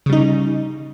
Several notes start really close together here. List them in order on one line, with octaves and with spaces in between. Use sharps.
C#3 G3 D#4